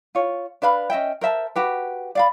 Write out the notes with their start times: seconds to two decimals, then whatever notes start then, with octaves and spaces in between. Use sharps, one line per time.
0.15 F4 C#5
0.62 D4 B4 F5 B5
0.90 C#4 D#5 E5 G5
1.21 A#4 C5 E5 A5
1.56 F#4 G4 B4
2.15 D5 F5 B5